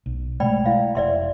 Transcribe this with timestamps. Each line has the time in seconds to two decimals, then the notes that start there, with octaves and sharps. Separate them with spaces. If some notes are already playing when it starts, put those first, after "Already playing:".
0.06 B1
0.40 B2 G#3 A3 D5 G5 B5
0.66 E4 F5
0.95 F1 D5 E5 C6